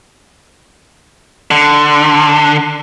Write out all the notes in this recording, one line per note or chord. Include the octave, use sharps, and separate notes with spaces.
D3